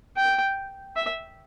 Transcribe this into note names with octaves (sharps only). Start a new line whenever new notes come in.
G5
E5